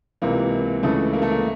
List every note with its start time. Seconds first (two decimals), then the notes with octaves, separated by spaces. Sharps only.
0.22 C#2 C3 E3 A#3
0.83 C#2 C#3 E3 A3
1.13 A#3
1.22 A3
1.31 A#3